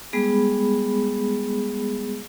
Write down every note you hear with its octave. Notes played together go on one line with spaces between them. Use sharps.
G3 G#3 B3 G#4 B5